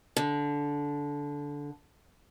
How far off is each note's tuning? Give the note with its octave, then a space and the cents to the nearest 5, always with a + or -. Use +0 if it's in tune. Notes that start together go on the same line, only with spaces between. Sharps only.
D3 -15